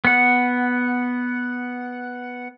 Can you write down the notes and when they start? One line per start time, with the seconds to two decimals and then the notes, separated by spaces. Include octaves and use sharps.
0.05 B3 F#5